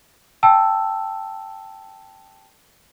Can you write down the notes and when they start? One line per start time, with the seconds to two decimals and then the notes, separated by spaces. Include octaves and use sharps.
0.43 G5 A5 E6